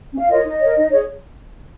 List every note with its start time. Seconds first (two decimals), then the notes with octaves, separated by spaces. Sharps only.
0.12 C#4
0.18 F5
0.28 F4 A#4 C#5 D#5
0.44 D#4
0.60 A#4 C#5
0.76 D#4
0.91 G#4 C#5